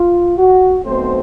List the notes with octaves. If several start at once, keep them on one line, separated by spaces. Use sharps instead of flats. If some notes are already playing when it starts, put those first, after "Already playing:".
Already playing: F4
F#4
B1 B2 F#3 A3 C4 C5